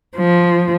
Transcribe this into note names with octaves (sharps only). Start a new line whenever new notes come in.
F3